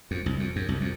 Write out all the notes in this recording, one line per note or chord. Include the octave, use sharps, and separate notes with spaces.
F2
C2
F2
F#2
C2
F2